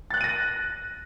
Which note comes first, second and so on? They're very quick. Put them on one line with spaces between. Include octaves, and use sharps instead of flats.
A6 F#6 F#7 D#7 A#6